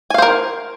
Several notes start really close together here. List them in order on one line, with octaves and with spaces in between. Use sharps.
G#5 F5 C5 A#4